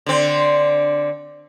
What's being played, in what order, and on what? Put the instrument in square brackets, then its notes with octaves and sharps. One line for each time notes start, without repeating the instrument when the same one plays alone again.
[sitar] D3 C4